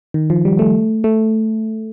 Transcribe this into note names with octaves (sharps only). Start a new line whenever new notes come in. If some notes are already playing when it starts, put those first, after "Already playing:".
D#3
F3
G3
A3
A3